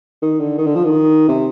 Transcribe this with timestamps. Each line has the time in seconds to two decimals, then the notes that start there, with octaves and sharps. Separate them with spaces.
0.22 D#3
0.40 D3
0.58 D#3
0.66 D3
0.76 F3
0.85 D#3
1.28 C3